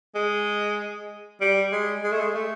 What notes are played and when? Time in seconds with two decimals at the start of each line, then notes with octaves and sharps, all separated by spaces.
0.15 G#3
1.41 G3
1.72 G#3
2.04 G#3
2.12 A3
2.20 G#3
2.35 A3